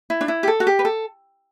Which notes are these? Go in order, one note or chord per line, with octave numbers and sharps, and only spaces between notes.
E4
D4
E4
G4
A4
F#4
G4
B4
A4